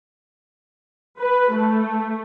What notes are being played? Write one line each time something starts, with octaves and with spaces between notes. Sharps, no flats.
B4
A3